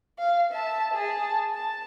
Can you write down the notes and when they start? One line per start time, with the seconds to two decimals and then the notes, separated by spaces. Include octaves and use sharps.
0.19 F5
0.52 E5 A5
0.94 G#4 A5
1.55 A5